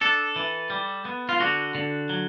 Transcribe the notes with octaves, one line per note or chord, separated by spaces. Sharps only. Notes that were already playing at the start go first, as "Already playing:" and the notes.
D4 A4
E3
G3
B3
F4
D3 F#4
D3
F#3